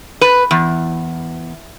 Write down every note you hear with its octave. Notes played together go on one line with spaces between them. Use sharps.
B4
E2